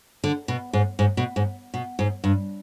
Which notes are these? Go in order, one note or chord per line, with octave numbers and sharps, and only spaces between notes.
D3
B2
G#2
G#2
B2
G#2
B2
G#2
G2